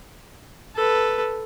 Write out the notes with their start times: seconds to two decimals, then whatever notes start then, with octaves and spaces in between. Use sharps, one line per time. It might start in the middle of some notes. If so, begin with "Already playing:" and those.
0.75 A4 B4